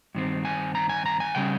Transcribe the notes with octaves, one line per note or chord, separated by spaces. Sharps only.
G2 D#3 C4
G#5
A#5
G#5
A#5
G#5
C#3 G3 C#4 G5